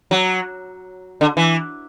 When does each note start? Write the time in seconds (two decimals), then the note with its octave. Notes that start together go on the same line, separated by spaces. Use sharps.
0.11 F#3
1.21 D3
1.37 E3